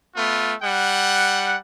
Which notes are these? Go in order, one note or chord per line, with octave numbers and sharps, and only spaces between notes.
A3 B3 F4
G3 F#5